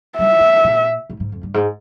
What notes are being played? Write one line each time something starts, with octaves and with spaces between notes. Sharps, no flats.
G3 E5
G#3
A#2
G#2
G#2
F2
G2
G#2